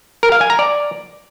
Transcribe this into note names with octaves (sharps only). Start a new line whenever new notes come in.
A#4
F5
G#5
A#5
D5